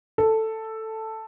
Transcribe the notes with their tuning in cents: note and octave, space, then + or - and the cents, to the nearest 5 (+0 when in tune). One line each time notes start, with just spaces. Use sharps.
A4 +5